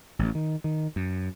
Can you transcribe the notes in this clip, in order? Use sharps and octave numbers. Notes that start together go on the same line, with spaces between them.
A1
D#3
D#3
F#2